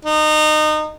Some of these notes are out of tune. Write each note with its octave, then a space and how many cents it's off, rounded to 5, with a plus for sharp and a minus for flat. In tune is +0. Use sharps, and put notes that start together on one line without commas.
D#4 -25